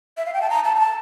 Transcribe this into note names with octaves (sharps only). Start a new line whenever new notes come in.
E5
F5
G5
A5
A#5
A5
A#5
A5